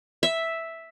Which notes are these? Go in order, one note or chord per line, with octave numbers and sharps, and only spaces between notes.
E5